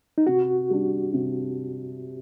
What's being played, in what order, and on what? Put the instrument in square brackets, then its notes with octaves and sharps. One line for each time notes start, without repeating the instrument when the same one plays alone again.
[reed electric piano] D#4
[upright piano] C3 [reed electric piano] F#4
[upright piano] G3 D4
C3